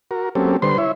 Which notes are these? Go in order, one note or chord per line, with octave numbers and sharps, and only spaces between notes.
F#4 A#4
F#3 A#3 C4 C#4 G4 A4
D3 G3 B4 C5 C6
E4 C#5 E5